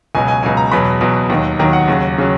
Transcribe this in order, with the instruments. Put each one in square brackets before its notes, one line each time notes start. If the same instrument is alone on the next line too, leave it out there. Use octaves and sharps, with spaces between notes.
[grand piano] C#2 B2 F#3 G#5
G#5
C#2 B2 F#3 G#5
A#5
E2 B2 F#3 B5
E2 B2 F#3
D#2 D#3 F#3
D#2 D#3 F#3 A#5
F#5
D#2 C#3 F#3
C#3 F#3